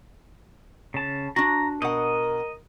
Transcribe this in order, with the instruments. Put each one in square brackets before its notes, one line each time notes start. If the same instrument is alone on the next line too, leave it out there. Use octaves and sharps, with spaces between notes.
[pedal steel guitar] C#3 A5
[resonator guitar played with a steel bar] D4 F#4 [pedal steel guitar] A#5
[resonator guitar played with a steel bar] B2 F#5 [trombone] A#4 [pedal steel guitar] D#5